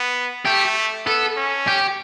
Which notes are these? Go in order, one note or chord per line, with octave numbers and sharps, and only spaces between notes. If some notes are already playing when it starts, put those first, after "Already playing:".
Already playing: B3
A3 G4
B3 A4
C#4
G4